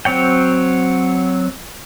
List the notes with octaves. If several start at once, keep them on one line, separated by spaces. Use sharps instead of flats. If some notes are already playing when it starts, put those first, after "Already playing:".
F#3 C4 C#5 G5